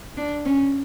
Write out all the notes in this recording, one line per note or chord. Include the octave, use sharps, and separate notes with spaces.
D4
C#4